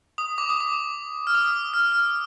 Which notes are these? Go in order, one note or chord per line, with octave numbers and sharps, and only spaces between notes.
D#6
D6
D#6
D6
F6
D#6
F6
F6